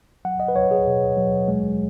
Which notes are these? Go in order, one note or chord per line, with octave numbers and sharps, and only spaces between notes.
F#3 F#5
D#5
B4
F#3 C#5
G#4
B2
F#3
G#3